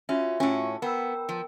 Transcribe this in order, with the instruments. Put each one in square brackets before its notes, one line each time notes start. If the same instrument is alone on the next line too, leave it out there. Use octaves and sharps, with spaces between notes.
[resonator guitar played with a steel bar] C#4 [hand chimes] F4 F#4 E5
[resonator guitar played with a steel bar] A2 C#4
[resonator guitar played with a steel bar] B3 [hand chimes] A#4 G5 E6
[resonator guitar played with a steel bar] F3